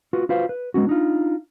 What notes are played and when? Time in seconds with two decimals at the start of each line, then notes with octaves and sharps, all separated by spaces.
0.13 F4 F#4 B4
0.29 F4 F#4 B4 C5 F5
0.49 B4
0.74 G#3 B3 C#4 F#4
0.87 D4 D#4 F4